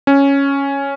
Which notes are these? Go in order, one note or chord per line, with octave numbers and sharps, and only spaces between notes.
C#4